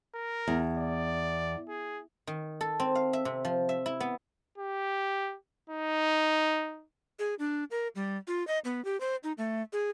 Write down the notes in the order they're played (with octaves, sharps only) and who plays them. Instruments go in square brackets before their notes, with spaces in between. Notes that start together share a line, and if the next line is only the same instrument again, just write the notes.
[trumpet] A#4
[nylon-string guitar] E2
[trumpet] D5
G#4
[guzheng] D#3
A4
C4
F5
E5
C3
F3
E5
E4
B3
[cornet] G4
D#4
[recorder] G#4
D4
A#4
G3
F4
D#5
B3
G4
C5
D#4
A3
G#4